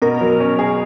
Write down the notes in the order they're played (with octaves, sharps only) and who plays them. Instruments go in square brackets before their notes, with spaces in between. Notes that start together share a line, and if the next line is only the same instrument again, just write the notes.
[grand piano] B2 [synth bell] A#4
[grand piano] F#3
C#4
G#4